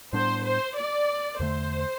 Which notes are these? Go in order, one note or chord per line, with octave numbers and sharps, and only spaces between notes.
A2 G3 B3 D4 C5
C5
D5
E2 D3 A3 C5